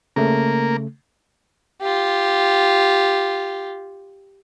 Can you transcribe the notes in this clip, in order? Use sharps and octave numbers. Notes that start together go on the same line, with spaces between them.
C#3 A3 A#3
F4 G4